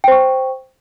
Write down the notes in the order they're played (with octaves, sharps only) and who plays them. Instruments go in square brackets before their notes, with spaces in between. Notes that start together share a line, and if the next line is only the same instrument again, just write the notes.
[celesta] G5
C5
C#6